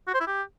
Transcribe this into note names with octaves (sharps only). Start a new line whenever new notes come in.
F#4
C5
E4
G4